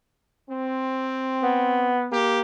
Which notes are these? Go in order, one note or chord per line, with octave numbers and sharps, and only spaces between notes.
C4
B3
A#3 G4